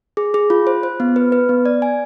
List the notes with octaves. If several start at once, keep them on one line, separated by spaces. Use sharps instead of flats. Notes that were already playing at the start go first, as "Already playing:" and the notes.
G#4
G#4
F4
C5
C5
B3
B4
B4
B3
D5
G#5